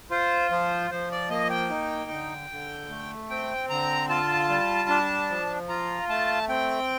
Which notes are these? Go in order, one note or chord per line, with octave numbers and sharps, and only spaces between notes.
F4 C5
F3 C5
F3 C5
D5
A#3 D#5
G5
D#4
D3
D3
A3
C4 G5
D3 A#5
F4 A5
G3
D4
F3
F4 A#5
A3 A5
C4 G5